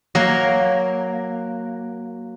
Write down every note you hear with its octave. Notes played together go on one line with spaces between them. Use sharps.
F#3 A#3